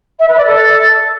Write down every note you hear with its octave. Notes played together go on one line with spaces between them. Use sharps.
E5
B4
D5
A4